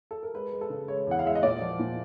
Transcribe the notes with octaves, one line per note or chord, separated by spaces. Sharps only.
A4
A#4
G#3 B4
G#3
A4
C#3
G#3 C#5
E2 F#5
F5
G#3 E5
D#5
A#2 D5
F3
A#2